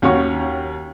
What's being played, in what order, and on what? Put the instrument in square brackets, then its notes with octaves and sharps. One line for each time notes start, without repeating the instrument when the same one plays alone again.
[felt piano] D#2 C#4 F#4 C#5 C#6